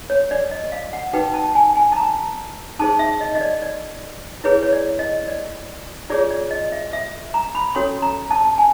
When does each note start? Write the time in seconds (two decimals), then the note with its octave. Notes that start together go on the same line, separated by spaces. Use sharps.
0.10 C#5
0.31 D5
0.51 D#5
0.72 F5
0.93 F#5
1.13 D#4 F#4 B4 G5
1.34 A5
1.55 G#5
1.76 G#5
1.92 A5
1.96 A#5
2.79 D#4 G#4 C5 A5
2.99 E5
3.21 D#5
3.35 D#5
3.41 D5
3.62 D5
4.44 E4 G#4 B4 C#5
4.63 C#5
4.73 D5
4.99 D#5
5.28 D5
6.10 F4 G#4 C#5 D5
6.31 D5
6.51 D#5
6.72 E5
6.93 E5
7.34 A#5
7.55 B5
7.75 C#4 F#4 A4 C#5 C6
8.02 A#5
8.31 A5
8.58 G#5